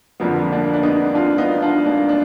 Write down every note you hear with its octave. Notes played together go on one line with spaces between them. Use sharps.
F2 D3 F3 A#3 B3
A#3 D4
D4
B3 D#4
D4 F4
B3 D#4
D4 F4
A#3 D4
D4